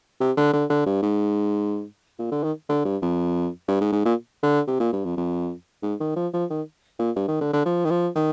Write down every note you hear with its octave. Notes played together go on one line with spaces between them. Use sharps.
C3
D3
D3
D3
G2
G#2
A#2
D3
D#3
D3
G2
F2
G2
G#2
G#2
A#2
D3
C3
A#2
G2
F2
F2
G#2
D#3
F3
F3
D#3
A#2
G2
D#3
D3
D3
F3
D#3
F3
D#3